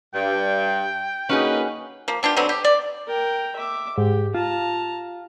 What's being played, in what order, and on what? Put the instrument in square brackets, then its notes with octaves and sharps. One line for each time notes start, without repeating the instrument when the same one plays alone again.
[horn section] G2 [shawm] G5
[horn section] A#3 D#4 B4 [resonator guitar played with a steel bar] C#4 F#4 G#4
[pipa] F3 A#3
B3 D4 F4 G4
D3 F#3 B3 C4
G4
D5
[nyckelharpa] A#4 G5
E5 D6
[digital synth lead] G#2 [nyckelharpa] G4
[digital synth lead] F4 [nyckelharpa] A5 A#5